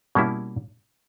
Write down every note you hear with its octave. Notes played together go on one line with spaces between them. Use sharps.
B2 G3 A#3 C#4 E4